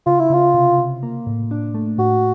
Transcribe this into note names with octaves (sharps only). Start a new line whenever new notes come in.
C#3 F4
E4
C#3 F4
C3
C3
A#3
A2
D4
A3
A2 F#4